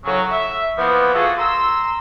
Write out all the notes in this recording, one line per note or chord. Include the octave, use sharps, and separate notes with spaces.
A2 C#3 F#3
E5
E3 F3 A#3 B3
F4 F#4 G#4 A4
A#5 C6 E6